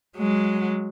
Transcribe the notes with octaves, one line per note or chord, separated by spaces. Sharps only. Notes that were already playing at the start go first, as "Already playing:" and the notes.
F#3 G#3